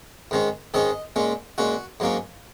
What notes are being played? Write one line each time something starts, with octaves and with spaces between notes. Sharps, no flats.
G#2 D#3 G#3 C#4
G#2 D#3 G#3 C#4 D#5
A#2 G#3 C#4
A#2 G#3 C#4 F#4
G#2 F#3 A#3 C#4